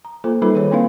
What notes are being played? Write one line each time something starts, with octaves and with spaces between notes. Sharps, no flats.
A#5
A#3 F4 A4 C5
G3 D#4 F4 A4 B4 B5
D#3 G#4 B4 C#5
A#3 C4 D4 E4 B4 F5